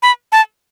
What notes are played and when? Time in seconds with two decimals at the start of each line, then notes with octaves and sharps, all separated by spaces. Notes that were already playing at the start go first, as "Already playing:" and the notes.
0.03 B5
0.32 A5